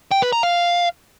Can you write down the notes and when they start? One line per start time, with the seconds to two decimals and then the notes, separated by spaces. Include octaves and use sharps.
0.11 G5
0.22 B4
0.33 A#5
0.43 F5